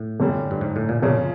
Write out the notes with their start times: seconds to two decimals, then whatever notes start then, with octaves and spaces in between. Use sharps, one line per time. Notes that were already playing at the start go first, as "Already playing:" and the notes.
Already playing: A2
0.20 G1 F#2 D3 G3
0.51 G2
0.61 G#2
0.76 A2
0.89 A#2
1.02 G1 F#2 A#2 C#3 F3